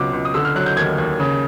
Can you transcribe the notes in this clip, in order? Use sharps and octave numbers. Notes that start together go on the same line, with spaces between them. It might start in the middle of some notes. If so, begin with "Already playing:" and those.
Already playing: C#2 B2 F#3 D6
C#2
D#6
D3 E6
F6
F#3 F#6
G6
D#2 G#6
D#2
C#3